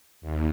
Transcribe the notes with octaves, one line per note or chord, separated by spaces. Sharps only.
D#2